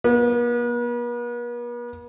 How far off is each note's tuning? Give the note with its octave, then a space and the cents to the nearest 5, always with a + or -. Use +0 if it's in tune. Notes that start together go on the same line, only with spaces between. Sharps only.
B3 -45